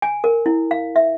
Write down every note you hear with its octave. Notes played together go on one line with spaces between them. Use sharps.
G#5
A#4
E4
F5
E5